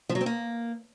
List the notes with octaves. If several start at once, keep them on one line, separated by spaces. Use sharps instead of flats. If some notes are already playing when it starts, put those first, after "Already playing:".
F3
F#3
C4
A#3